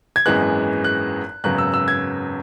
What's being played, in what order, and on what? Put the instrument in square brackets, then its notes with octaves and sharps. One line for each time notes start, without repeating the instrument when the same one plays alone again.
[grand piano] G#6
G#1 F#2 E3 G#3 B3 F#6
F#6
G#1 F#2 C#3 F#3 B3 F#6
E6
E6
G#6